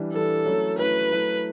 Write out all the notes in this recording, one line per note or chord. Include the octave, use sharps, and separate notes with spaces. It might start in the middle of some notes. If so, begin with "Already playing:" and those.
Already playing: E3 G3 D4
E3 G3 D4 A4
F#3 A3 C#4 E4
F#3 A3 C#4 E4 B4
F#3 A3 E4